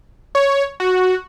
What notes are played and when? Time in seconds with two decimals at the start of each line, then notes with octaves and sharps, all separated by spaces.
0.35 C#5
0.80 F#4